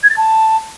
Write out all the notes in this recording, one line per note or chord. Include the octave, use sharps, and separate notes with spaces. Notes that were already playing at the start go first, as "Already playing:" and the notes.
G#6
A6
A5